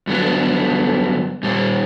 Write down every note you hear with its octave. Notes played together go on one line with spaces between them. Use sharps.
G2 D3 F#3 B3 D4
A#2 G3 A#3